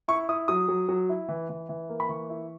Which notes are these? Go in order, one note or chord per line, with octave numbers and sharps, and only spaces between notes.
E4 C#6
E4 D#6
F#3 D#6
F#3
F#3
E4
E3
E3
E3
A#3
B5
E3 C#6
E4